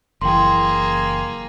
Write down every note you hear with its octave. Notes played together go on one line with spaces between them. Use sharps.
F#1 E3 A#3 G#4 G5 C6